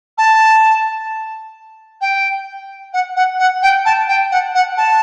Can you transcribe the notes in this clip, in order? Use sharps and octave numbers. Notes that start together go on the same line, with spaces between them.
A5
G5
F#5
F#5
F#5
G5
A5
G5
F#5
F#5
A5